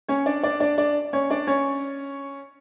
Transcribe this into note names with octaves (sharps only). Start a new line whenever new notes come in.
C#4 C#5
D4 D5
D4 D5
D4 D5
D4 D5
C#4 C#5
D4 D5
C#4 C#5